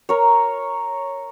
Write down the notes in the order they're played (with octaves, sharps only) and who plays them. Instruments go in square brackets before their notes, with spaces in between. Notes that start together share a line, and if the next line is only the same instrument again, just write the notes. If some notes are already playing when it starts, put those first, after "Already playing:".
[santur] A#4 C#5